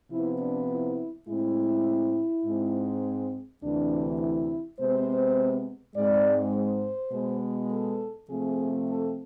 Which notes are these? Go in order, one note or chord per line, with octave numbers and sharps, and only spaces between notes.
C3 F3 B3 E4
D4
E4
A2 G#3 C4 E4
G#2 G#3 C4
D2 C3 E3 D4
E4
C3 G#3 B3 C5
G#2 G#3 C4 D5
C5
B2 G#3 B3
A4
C3 F3 A3 C4 G#4
A4